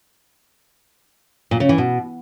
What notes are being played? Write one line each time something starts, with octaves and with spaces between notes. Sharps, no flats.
A#2
C#3
E3
B2